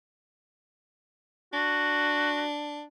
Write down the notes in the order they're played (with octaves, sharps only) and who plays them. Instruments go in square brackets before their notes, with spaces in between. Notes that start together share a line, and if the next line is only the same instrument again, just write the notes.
[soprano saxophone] D4 [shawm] F#4